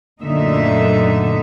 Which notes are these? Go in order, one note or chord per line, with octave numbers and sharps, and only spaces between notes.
F#2 A#2 D3 A3 D#4 E5